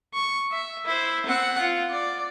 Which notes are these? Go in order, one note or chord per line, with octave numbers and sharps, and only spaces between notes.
C#6
E5
E4 C5
C4 F#5
F4
D5